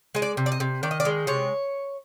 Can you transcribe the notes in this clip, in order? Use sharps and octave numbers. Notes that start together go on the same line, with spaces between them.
G#3 D#5
D5
C3
D5
D#5
C3
D#3 D5
D#5
D5
G#3
C3 C#5